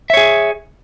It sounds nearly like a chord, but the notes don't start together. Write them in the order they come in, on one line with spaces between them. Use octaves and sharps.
E5 C#5 G#4